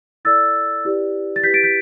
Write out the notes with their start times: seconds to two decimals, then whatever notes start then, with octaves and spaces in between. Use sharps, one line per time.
0.25 E4 A4 D5 E6 A6
0.85 E4 G4 B4 D5
1.36 A6
1.43 E4 G4 B4 G6 B6
1.54 A6 D7
1.63 G6 B6